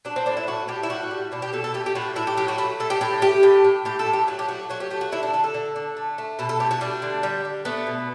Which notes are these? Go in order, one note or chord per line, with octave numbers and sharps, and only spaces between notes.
F#3 D4
C4
A2 D4
E4
A3 F#4
A2 G4
E4
G3 F#4
G3
B2 D4
G4
B2 A4
A4
A3 G4
G4
A2 F#4
A2 E4
G4
F#3 G4
F#4
A3 E4
A2 A4
G4
A2 G4
A3 G4
A2
A2
A2 G4
A4
A2
G4
F#3 F#4
G4
A3 F#4
F#3 F#4
G4
A3 G4
F#4
D3 E4
D4
D3 A4
A4
D3
D3
A3
A3
B2 A4
A4
A3 G4
F#4
G3 D4
D3
G3
G3
A3 B3
B2